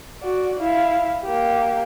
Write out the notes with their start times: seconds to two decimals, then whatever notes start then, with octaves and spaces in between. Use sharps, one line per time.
0.22 F#4 D5
0.59 E4 F5
1.24 A#3 G4